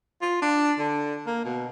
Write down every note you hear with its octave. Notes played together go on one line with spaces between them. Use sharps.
F4
D4
D3
A#3
B2